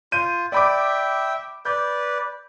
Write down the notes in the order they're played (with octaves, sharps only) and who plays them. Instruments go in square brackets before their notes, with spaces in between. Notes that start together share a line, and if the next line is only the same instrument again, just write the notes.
[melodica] F4 [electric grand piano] G6 D#7
[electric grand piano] D5 B5 D6 [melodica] E5 G5
[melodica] B4 D5 [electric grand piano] G6